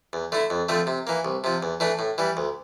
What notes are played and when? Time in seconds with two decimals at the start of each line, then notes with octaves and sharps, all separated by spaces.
0.13 E2
0.32 D3 A3 E4
0.50 F2
0.69 D3 F3 A3 C4
0.87 C3
1.07 E3 A#3
1.25 C2
1.44 C3 F3
1.63 E2
1.80 E3 A3 D4
1.99 A2
2.18 E3 G3
2.37 D2